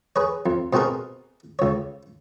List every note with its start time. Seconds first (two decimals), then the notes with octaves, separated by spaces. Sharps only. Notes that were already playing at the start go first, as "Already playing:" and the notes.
0.16 G#4 B4 C#5
0.46 F2
0.73 B2 C4 F#4 G#4 A#4
1.59 C#2 C#5